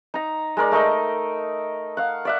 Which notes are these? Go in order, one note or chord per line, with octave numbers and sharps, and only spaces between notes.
D#4 A#5
G#3 A#4 D5
A3 D#4 A#4 D#5
F5 F#5
D5 E5 F#5